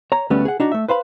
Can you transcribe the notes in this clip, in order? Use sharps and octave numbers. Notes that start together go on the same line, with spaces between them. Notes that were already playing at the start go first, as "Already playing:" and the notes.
C#5 A#5
D2 G3 A3 B3 C#4
G#4 F#5
D4 D#4 F#4
A3 E5
B4 C5 F5 B5